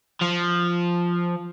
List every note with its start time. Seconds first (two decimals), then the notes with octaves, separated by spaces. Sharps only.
0.22 F3